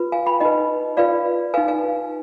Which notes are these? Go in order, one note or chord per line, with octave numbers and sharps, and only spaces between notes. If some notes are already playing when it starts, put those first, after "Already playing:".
Already playing: F4 B4
F5 G#5
G5 B5
D#4 B4 D#5 G5
F4 B4 D5 F5
D#4 B4 F5 G#5
F5 G#5